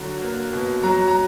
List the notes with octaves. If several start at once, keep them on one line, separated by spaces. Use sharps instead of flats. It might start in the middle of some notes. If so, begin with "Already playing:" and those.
Already playing: D3 F#3
A#3
B2
F#3 A#5
A#5